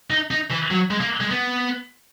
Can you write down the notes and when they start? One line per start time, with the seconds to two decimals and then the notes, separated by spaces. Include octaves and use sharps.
0.10 D#4
0.31 D#4
0.51 E3
0.71 F#3
0.91 G#3
1.01 A#3
1.21 G#3
1.31 B3